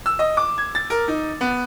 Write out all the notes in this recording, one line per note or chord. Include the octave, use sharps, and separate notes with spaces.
E6
D#5
D6
G#6
A6
A#4
D#4
B3